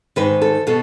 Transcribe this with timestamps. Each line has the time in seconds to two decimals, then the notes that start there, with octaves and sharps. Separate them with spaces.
0.16 G#2 D#3 B4
0.42 A4
0.67 B2 A4